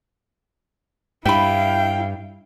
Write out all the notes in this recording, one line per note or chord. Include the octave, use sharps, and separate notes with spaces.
G2 E4 E5 F5 G5 B5